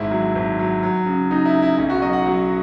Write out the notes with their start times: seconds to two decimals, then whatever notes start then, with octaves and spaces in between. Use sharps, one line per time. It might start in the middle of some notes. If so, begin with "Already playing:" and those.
Already playing: G#1 G#3 E4
0.11 F#3
0.35 G#1
0.59 F#3
0.83 F#3
1.06 C#3
1.31 C#3 D#4
1.46 E4
1.55 C#3
1.62 E4
1.78 B1 E4
1.90 F#4
2.02 F#3 D#5
2.13 F#5
2.25 F#3